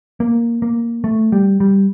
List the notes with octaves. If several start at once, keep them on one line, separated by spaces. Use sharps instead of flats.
A#3
A#3
A3
G3
G3